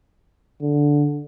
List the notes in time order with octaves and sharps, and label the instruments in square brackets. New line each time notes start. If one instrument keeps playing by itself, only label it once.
[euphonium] D3